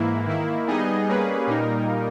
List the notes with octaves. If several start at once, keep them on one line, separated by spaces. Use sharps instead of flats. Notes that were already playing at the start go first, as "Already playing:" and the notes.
Already playing: G#2 E3 A#3 E4
D#3 A#3 E4
G3 B3 D#4 G#4 D#5
G3 A#3 C#4 G#4 B4
A#2 G3 A#3 D#4 A#4